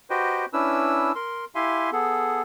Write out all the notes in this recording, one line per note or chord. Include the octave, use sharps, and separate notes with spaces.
F#4 G4 B4 C5 D#5 G5
C#4 D4 E4 B4 E6
A#4 C6
E4 G4 E5 F5 G#5 C6
B3 G#4 A4